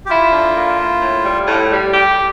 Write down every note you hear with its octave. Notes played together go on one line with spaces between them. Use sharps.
G4
E4 F4
D3
A#3
E4
A2
G3
A2
G3
G4